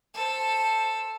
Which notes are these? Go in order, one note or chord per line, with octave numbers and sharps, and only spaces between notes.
A4 C5